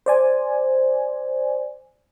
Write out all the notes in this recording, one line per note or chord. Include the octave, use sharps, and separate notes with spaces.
C5 D5 G#5